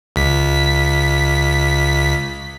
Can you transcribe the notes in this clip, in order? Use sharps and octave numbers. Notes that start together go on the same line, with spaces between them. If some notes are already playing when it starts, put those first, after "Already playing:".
C#2 B6